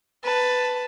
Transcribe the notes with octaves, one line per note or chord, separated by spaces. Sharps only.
B4 A5